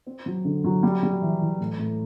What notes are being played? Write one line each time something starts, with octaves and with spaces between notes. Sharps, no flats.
C4
F#3
D3
F#3
G3
G3
E3
E3
A2
A2